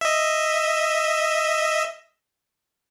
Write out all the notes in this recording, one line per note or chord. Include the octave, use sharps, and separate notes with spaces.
D#5 E5